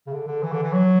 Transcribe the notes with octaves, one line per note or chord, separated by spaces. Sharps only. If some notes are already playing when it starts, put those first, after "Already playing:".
C#3
D3
D3
E3
D3
E3
F#3